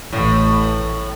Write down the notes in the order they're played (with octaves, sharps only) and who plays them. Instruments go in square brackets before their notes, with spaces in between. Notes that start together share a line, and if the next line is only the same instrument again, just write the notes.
[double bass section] A1 [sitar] A2